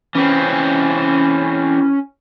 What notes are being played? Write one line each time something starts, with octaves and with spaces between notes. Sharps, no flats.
E3 C4 C#4